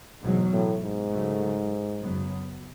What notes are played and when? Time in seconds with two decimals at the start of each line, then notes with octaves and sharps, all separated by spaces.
0.23 E2 G#2 B2 F#3
0.53 A2
0.83 G#2
1.11 C#3 F#3 A3
1.99 F#2 C#3 F#3 B3